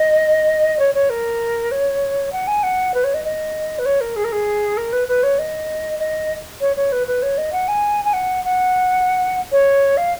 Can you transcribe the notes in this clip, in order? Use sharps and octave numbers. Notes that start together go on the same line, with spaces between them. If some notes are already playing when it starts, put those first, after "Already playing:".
Already playing: D#5
C#5
C#5
A#4
C#5
F#5
G#5
F#5
B4
C#5
D#5
D#5
B4
C#5
A#4
G#4
A#4
G#4
A#4
B4
B4
C#5
D#5
D#5
C#5
C#5
B4
B4
C#5
D#5
F#5
G#5
G#5
F#5
F#5
C#5
F5